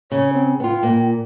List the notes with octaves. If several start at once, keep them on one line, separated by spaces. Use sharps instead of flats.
C#3 C#5
C4
B3 F4 G5
A#2